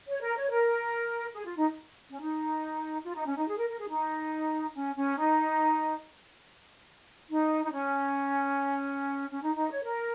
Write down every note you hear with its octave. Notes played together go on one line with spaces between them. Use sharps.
C#5
A#4
C#5
A#4
G#4
F4
D#4
C#4
D#4
F4
D#4
C#4
D#4
G#4
A#4
A#4
G#4
D#4
C#4
C#4
D#4
D#4
D#4
C#4
C#4
D#4
D#4
C#5
A#4